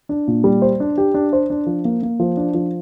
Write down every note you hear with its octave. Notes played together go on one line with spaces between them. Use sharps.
D4
A#2
G3
C5
D4
G4
D4
C5
D4
F3
A#3
A#3
F3
D4
F3